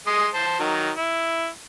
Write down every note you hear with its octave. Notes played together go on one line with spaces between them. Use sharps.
G#3 C6 D#6
C5 A5
D#3 F#3
E4